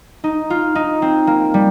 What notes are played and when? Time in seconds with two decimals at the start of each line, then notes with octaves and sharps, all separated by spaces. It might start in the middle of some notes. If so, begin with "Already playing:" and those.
0.24 D#4
0.50 F4
0.75 D#4
1.02 C4
1.27 A#3
1.54 G3